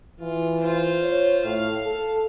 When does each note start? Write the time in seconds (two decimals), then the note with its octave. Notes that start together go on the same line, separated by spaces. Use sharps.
0.20 E3 F4
0.59 F4 C5
1.03 C#5
1.44 A2 F5
1.85 A4